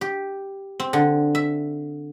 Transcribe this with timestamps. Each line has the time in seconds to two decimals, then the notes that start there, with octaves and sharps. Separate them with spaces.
0.01 G4
0.80 C4
0.93 D3
1.35 E5